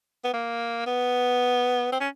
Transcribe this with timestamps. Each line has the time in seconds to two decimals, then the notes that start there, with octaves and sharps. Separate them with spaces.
0.24 B3
0.34 A#3
0.86 B3
1.92 C4
2.00 C#4